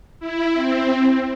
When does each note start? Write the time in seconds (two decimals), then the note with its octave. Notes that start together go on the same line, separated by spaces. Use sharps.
0.20 E4
0.53 C4